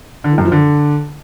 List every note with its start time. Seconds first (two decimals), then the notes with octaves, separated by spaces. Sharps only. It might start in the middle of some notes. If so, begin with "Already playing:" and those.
0.24 D3
0.31 E3
0.38 F#2
0.45 F3
0.52 D3